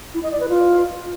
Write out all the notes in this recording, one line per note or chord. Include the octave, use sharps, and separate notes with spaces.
E4
D#5
D5
B4
F4